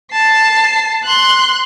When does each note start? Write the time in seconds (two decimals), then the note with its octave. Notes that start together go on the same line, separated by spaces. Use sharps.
0.13 A5 C7
1.04 C6 F#6